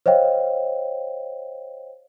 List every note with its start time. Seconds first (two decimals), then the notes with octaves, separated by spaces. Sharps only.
0.06 C5 C#5 D#5 F5 G5